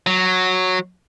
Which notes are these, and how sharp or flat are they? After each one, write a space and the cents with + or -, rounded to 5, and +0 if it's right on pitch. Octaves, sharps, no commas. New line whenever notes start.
F#3 -5